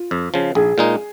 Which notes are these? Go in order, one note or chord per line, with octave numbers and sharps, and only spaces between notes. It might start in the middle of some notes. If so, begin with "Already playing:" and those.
Already playing: F4
F2
C#3 F3
A#1 G#4
A#2 G#3 D#4